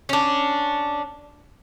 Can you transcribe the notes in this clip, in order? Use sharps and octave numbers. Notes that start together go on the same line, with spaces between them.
C#4 D4